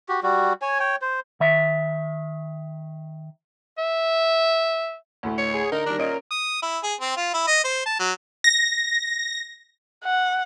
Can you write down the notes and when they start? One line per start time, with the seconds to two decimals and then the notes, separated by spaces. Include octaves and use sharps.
0.09 F#4 G4
0.23 G3 F#4
0.62 C#5 G#5
0.79 C#5 G5
1.02 C5
1.40 D#3 E5
3.78 E5
5.23 D2 A2 A3
5.38 C#5
5.54 G#4
5.72 D3 D#4 A#4
5.86 D#3 G3 D4
5.98 A#2 C#4 D#5 D7
6.31 D#6
6.62 E4
6.83 G#4
7.01 C4
7.16 F4
7.33 E4
7.47 D#5
7.64 C5
7.85 A5
8.00 F#3
8.44 A#6
10.04 F#5